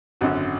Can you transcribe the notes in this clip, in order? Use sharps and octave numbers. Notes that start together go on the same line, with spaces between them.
G#1 F#2 D3 F#4